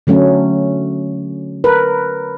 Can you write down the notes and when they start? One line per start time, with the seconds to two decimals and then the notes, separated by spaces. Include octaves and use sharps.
0.07 D3 F#3 A3 C#4
1.64 A#4 B4